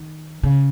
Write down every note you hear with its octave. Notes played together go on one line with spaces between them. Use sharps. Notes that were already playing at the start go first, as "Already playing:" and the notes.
Already playing: D#3
C#3